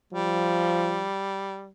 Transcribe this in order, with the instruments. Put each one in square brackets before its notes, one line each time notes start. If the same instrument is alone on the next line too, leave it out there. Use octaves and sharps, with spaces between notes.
[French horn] F3 [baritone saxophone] G3